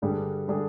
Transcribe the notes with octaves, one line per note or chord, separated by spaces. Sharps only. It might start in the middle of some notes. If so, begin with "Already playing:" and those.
G2 D3 G3 D4 G#4
D3 G3 D4 G#4